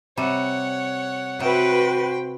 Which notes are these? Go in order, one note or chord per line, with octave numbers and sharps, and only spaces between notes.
C3 G3 C#5 F#5
C3 F#4 B4 C5 G5